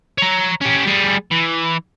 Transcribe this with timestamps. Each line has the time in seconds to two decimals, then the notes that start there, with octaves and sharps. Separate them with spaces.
0.18 C#5 A#5
0.61 C#4 G4
0.86 G3 G#4
1.31 E3